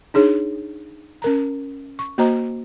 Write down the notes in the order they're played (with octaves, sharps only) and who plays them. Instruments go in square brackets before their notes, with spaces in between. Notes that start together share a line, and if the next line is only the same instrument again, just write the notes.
[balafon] D4 D#4 G#4 C#5
C#4 A#4 A#5
C#6
A#3 F#4 C5 D#5 A#5